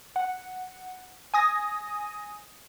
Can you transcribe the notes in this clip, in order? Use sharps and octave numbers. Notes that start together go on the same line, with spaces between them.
F#5
G#5 D#6 A#6